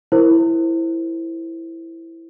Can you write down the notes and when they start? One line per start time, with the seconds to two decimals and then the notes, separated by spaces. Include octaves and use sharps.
0.12 E4 A#4 C5